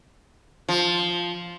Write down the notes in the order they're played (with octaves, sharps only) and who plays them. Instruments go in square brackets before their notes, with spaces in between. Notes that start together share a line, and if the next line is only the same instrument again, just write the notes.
[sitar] F3